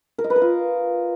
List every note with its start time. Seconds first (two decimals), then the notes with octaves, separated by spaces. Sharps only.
0.18 A#4
0.24 D#5
0.30 B4
0.36 A#4
0.42 F4